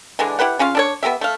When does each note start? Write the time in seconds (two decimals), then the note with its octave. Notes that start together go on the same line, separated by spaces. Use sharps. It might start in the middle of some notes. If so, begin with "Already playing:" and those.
0.19 D3 E3 G#3 D4
0.39 E4 G4 B4 F#5
0.59 C#3 C#4 F4 F5
0.75 D4 A4 C#5
1.03 B3 C#4 G4 E5
1.21 A3 F5